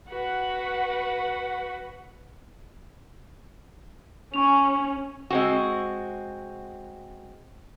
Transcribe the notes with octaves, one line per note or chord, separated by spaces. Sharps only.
F#4 B4 F#5
C#4 G#5 C#6 F7
G#3 C4 F#4